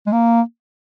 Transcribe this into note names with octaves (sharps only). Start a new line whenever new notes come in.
G#3
A#3